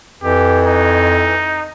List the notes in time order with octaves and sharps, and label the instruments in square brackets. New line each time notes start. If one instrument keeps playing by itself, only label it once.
[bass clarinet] F2 [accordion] E3 [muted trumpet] G4
[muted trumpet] D#4